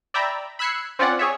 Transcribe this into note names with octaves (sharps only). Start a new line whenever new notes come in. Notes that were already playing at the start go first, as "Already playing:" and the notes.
D5 E5 G5 A#5 B5
B5 E6 F#6 G#6 C7 C#7
C4 C#4 F4 D5 F#5
G#4 C#5 E5